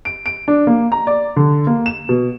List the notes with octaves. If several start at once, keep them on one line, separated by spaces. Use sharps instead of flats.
D7
D7
D4
A#3
A#5
D5
D3
A#3
E7
B2